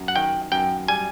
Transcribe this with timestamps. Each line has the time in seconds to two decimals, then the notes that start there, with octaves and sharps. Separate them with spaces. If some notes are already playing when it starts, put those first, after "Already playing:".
Already playing: F#2
0.08 F#5
0.16 D#3 G5
0.52 F#2 G5
0.88 G3 G#5